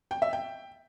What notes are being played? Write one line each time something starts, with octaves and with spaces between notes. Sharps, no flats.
G5
E5
G5